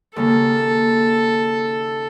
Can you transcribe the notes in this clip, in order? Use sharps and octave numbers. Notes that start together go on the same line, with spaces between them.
D#2 C#3 A#3 A4